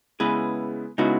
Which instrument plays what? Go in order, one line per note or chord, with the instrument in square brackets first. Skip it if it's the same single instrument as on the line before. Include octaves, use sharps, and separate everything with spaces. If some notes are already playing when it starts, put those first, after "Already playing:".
[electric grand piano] C#3 G#3 B3 E4 [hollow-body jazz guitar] G#4 B4
[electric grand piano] C#3 G#3 B3 E4 [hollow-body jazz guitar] D#4 F#4